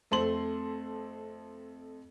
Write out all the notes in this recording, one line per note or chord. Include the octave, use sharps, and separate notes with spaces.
F2 A3 C4 C6 F#7